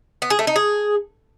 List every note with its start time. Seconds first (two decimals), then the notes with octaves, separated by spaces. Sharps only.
0.22 B3
0.30 G#4
0.39 A3
0.47 D#4
0.56 G#4